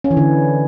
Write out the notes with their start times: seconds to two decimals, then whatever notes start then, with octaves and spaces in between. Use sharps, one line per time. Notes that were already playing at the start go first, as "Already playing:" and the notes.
0.04 C#4
0.11 E3
0.17 D3